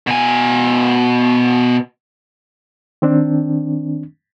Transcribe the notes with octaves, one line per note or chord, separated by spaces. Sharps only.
B2 G#5
D#3 C4 D4